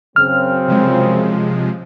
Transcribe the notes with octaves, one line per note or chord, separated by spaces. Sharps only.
F#2 C#3 C4 F6
C3 F3 G#3